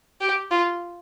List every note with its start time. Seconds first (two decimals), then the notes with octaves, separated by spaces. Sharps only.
0.21 G4
0.51 F4